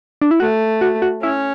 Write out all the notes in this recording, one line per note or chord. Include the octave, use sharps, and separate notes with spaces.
D4
E4
A3 F#4
F#4
F#4
C#4 E4